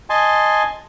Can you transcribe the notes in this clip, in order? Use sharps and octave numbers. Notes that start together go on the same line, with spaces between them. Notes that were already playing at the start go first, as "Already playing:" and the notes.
D#5 G#5 A5 C6